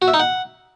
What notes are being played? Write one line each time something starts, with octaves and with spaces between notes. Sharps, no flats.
F#4
E5
D#4
F#5